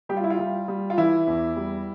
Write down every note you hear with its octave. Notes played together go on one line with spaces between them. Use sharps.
G3 G4
F4
E4
F4
G3
G3
F4
E3 E4
E2
G3